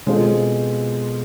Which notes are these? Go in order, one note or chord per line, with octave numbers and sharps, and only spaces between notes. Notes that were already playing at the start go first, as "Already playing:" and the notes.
B2 G#3 C4 F4 A4